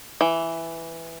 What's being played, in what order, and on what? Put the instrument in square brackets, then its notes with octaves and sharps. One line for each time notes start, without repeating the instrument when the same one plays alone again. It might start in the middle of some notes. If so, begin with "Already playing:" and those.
[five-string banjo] E3